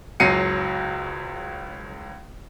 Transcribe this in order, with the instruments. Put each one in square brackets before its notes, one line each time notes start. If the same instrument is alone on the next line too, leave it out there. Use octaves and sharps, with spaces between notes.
[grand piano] F#1 C#2 F#3 C7 C#7 D#7